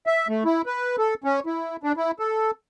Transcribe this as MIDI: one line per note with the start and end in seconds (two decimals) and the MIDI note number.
0.07 0.28 76
0.29 0.44 57
0.45 0.62 64
0.66 0.96 71
0.98 1.14 69
1.24 1.40 61
1.46 1.76 64
1.83 1.92 62
1.97 2.11 64
2.19 2.51 69